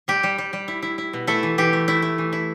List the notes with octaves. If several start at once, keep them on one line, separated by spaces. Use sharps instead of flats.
G3 G4
G3
G3
G3
E4
E4
E4
B2
A3 E4 A4
E3
E3 G4
A3
A3 E4
A3
E3
E4